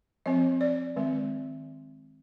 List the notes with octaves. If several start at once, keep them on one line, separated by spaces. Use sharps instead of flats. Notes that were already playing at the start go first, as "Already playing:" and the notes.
F3 C4 D#5
D5
D#3 G#3 C4